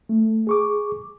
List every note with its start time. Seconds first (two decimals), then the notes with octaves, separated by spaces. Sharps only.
0.09 A3
0.47 G#4 C#6 D6